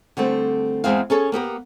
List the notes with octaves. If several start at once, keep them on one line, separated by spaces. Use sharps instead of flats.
D3 G3 A3 C4
E2 G#3 C4 F5
C#4 G#4 A4 C#5
A#3 B3 G4 A#4